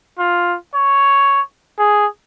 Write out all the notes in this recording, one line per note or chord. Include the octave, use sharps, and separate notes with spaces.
F4
C#5
G#4